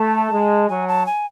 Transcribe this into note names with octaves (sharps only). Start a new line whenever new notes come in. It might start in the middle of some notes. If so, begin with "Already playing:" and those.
Already playing: A3 A5
G#3
F#3 G#5
A5
G#5